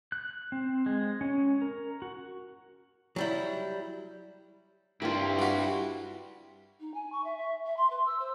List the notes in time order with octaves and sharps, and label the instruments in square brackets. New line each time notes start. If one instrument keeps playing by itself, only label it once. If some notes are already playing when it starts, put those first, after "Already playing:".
[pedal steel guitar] F#6
C4
G#3
C#4
A#4
F#4
[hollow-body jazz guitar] F#3 G3 E4
[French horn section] G2 [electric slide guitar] E4 G4 [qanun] F4 A#4
[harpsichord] G3 F#4
[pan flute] D#4
G#5
C#6
E5
E5
E5
C6
B4
E6
C5